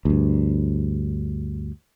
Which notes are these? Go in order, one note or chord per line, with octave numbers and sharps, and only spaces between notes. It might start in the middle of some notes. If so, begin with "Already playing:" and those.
D2 G2